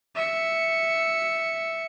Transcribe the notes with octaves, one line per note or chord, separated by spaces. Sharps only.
E5 C#7